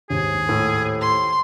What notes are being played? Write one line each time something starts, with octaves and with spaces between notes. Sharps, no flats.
D#2 G#2 G#4
A2
C6